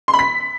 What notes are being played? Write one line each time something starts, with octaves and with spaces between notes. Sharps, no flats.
C6
B5
B6